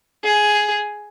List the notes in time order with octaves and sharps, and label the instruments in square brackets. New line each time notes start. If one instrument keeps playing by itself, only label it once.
[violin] G#4